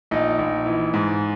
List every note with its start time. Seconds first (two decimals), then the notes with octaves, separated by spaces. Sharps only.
0.11 A#1 D#4
0.39 A#1
0.66 E3
0.94 G#2